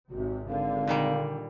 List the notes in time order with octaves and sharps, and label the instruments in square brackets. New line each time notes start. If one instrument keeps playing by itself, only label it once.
[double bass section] G#1 C3 [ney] F#4
[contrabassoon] G#1 [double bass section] D3 [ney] F5
[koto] A#2 D#3 G3